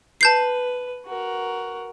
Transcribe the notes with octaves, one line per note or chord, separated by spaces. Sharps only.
B4 A5 G6 C7
F#4 A#4